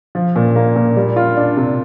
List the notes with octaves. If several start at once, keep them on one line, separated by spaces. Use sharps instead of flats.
F3
A#2
A#3
A#2
G3
F4
D4
C3